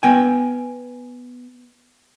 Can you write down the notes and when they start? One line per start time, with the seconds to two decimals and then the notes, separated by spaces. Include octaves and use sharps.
0.03 B3 G5 G#5